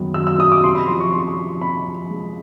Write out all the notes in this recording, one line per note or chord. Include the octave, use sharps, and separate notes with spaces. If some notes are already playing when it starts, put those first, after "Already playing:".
Already playing: F#2 D#3 F#3 B3
F#3 E6
E6
F#3 D#6
D6
C3 C6
B5
F3 C6
C#6
C3 C6
F3
C3 B5
F3
G#3